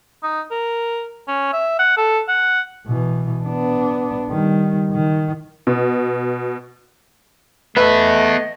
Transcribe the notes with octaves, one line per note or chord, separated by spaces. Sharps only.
D#4
A#4
C#4
E5
F#5
A4
F#5
B2 E3
B3 D4
D#3 G3
D#3
B2
A3 B3 B4 D#5 E5